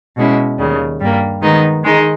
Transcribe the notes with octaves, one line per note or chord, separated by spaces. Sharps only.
B2 G#3 C#4 E4
D#2 C#3 G3
G2 G3 A#3
D#3 G#3 B3 D#4
D#3 G#3 D#4